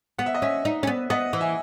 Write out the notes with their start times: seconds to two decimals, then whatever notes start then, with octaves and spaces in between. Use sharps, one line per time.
0.18 B3 F#5
0.26 E5
0.34 D#5
0.42 C#4 E5
0.65 D#4
0.83 C#4
0.87 B3
1.10 B3 D#5 F#5
1.33 E3
1.41 E5 G#5